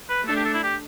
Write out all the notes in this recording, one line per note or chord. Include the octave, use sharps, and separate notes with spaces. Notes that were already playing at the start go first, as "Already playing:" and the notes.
B4
A3 D4 A4
G4
A4
E4
G4